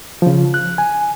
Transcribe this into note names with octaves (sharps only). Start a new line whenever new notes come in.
C#3 F3
F#6
G#5